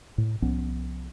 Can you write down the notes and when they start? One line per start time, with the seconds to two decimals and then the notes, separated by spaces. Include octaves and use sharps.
0.18 A2
0.42 C2 F3 B3 C#4